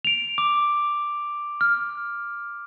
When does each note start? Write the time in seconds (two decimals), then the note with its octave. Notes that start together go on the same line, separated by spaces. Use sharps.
0.05 D7 F7
0.38 D6
1.61 F6